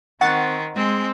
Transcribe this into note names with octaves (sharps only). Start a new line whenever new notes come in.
D#3 C4 F#5 C#6 A6
G#3 C4